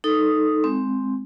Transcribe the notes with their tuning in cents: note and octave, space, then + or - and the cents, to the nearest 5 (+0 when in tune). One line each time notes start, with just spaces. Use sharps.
D#4 +0 A4 +0 D#6 +0
G#3 +0 C4 +0